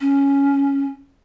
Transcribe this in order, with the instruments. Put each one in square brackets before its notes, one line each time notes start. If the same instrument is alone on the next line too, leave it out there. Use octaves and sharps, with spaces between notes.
[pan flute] C#4